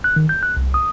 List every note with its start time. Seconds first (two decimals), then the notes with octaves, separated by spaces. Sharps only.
0.04 F#6
0.16 D#3
0.29 G6
0.43 F#6
0.57 C2
0.74 D#6